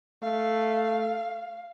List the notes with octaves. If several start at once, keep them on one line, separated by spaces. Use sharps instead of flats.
A3 F5